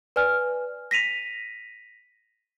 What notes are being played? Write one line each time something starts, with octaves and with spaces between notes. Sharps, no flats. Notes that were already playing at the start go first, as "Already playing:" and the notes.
B4 D5 G#5 F6
A#6 B6 D#7 F7